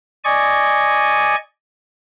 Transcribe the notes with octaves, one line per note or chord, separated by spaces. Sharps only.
D5 D#5 G#5 C#6